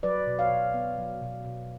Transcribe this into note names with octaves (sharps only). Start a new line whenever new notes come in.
F#3 B4 D5
B2
C#5 F5
B2
B3
F#3
B2
B2